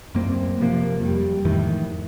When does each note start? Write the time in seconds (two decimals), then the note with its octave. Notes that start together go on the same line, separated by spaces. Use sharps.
0.15 F#2 A#3 C4
0.61 C3 F3 A#3
1.01 F2 G3
1.45 F2 A2 D#3 E3